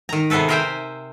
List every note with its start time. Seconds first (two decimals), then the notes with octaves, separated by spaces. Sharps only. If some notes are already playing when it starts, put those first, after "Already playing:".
0.09 D#3 A#5
0.30 C3 B3 G#4 A4 B4
0.48 A#4 C5 E5 G5 G#5